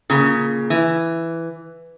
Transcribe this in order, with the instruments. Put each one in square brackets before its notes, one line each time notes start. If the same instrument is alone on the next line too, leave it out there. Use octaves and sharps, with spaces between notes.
[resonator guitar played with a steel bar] A#2 C#3
E3